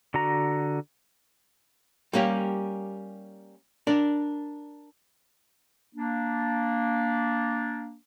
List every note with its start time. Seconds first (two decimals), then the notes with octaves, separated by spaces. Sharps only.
0.14 D3 F#4 A#5
2.13 G3 A#3 C#4 G4
3.87 D4 A#4 D5
5.95 A#3 D4